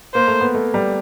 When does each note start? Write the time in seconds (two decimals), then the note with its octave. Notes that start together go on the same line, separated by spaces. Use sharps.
0.14 A#3 C5
0.28 A3
0.40 B3
0.55 A3
0.74 G3